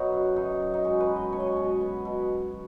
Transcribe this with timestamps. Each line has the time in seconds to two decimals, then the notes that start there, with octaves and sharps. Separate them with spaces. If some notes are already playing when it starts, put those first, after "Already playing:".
Already playing: B2 F#3 B3 D#4 F#4
0.12 F#2
0.36 F#2 D#4
0.60 F#2
0.74 D#4
0.84 G#3 F#4
1.00 B4
1.09 B2
1.16 D#5
1.33 B2 C#5
1.40 D#5
1.47 C#5
1.57 B2
1.81 B3
2.05 B2